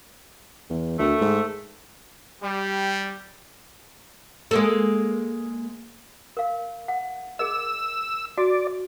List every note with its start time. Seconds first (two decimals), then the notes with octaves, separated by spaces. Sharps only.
0.70 E2
0.99 D2 D#3 A3
1.21 G#2
2.42 G3
4.51 G#3 A#3 A4
6.37 A#4 F5
6.88 F#5
7.39 G#4 A#4 D#5 E6
8.38 F#4 D5